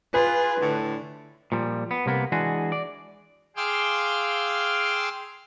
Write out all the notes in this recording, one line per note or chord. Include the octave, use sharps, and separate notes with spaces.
F4 G#4 B4
A2 D3
A#2 F3 G3
B3
C2 C3 A#3 B3
E3 G#3 D4 F#4 G#4
D5
G#4 F5 G5 C6 D6 E6